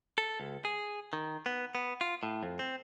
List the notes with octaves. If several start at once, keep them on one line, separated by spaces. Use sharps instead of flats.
A4
C#2
G#4
D#3
B3
B3
F4
A2
F2
C4